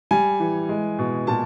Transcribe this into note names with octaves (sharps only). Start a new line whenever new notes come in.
G3 G#5
E3
G#3
B2
A#2 A5